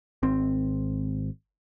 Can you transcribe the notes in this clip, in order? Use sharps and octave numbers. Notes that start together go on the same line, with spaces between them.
G#1 C4